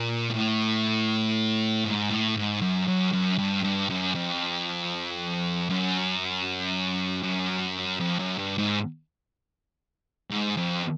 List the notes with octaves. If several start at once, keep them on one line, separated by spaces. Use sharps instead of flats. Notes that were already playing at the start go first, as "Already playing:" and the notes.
Already playing: A#2
A2
G#2
A2
G#2
F#2
F#2
F#2
G2
G2
F#2
F2
F#2
F#2
F2
F#2
G2
G#2
G#2
F2